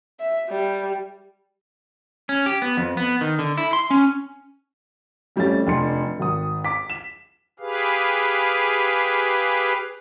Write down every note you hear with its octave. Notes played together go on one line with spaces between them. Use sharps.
E5
G3
C#4
G4
B3
F2
B3
D#3
D3
E4
C6
C#4
F2 G3 A3 C#4 A6
F1 D4 C6 C#7
G#1 D#6
D6 B6
E7
G4 G#4 B4 F5